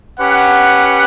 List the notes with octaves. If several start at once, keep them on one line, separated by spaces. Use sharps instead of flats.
C#4 G4 B4 F#5